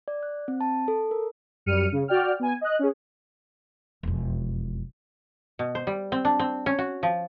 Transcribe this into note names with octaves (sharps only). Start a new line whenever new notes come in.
D5
F#6
C4
A5
A4
A#4
F#2 G3 F6 C#7 D#7
C#3
F#4 D5 G5 F6
B3 G#5
D#5 F#6
C#4 G#4
E1 F2
B2
C5
G3
C4
D4
C4
C#4
F#4
F3